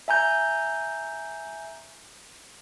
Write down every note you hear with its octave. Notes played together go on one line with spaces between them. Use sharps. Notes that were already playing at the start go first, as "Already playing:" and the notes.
E5 G#5 A#5 G6